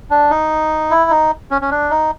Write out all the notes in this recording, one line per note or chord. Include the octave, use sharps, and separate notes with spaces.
D4
D#4
E4
D#4
C#4
C#4
D4
D#4